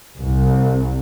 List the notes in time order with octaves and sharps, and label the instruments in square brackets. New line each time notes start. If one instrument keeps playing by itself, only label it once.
[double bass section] C2